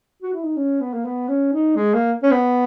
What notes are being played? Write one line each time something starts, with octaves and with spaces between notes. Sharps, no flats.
F#4
E4
D#4
C#4
B3
A#3
B3
C#4
D#4
G#3
A#3
C#4
B3